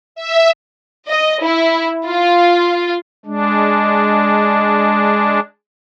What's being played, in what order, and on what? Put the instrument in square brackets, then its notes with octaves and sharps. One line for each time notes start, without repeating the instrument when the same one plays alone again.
[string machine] E5
[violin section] D#5
E4
F4
[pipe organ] G#3 D4